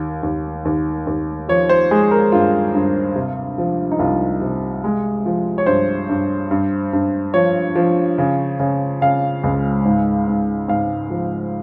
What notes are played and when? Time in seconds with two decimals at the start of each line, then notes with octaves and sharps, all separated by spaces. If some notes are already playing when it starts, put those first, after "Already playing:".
Already playing: D#2
0.23 D#2
0.65 D#2
1.07 D#2
1.49 F3 C#5
1.69 C5
1.91 G#3 G#4
2.11 A#4
2.32 G2 F4
2.75 G2
3.16 C3
3.58 F3
3.91 D#4
3.99 C2 F4
4.41 C3
4.84 G#3
5.26 F3
5.58 C#5
5.66 G2 C5
6.09 G2
6.51 G2
6.93 G2
7.34 F3 C#5
7.75 F3
8.18 C#3
8.59 C#3
9.01 C#3 F5
9.44 C#2
9.85 G#2
10.27 G#2
10.68 G#2 F5
11.10 F3